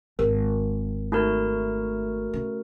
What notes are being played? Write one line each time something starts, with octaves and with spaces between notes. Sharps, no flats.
G#1 A#4
A3 D#4 F#4 A#4
C#3